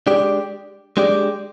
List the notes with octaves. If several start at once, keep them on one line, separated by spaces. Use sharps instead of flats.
G#3 D4 G4 D5
G#3 D4 G4 D5